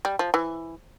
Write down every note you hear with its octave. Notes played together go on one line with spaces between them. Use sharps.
G3
F3
E3